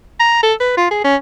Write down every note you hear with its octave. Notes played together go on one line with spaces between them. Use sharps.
A#5
A4
B4
F4
G#4
C#4